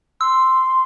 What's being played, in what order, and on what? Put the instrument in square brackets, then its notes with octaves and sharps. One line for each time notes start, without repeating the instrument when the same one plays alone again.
[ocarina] C6 [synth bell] E6